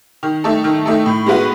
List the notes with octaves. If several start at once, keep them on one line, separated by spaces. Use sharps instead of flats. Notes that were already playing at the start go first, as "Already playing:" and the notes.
D#3
A3 D#4 A4
D#3
A3 D#4 A4
A2
G#3 B3 F#4 B4